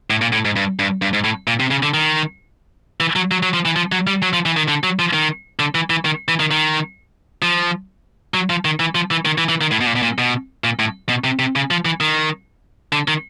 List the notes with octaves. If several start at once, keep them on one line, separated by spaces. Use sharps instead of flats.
A2
A#2
A2
G#2
G2
G2
G2
G#2
A2
A#2
C3
C#3
D3
D#3
E3
F#3
F#3
F#3
F3
E3
F3
F#3
G3
F#3
F3
E3
D#3
D3
F#3
F3
D#3
D3
E3
E3
D#3
E3
D#3
D#3
F3
F#3
F3
D#3
E3
F3
E3
D#3
E3
E3
D#3
A2
B2
A#2
B2
A#2
B2
A#2
A2
B2
C3
C3
C#3
F3
E3
D#3
D3
D#3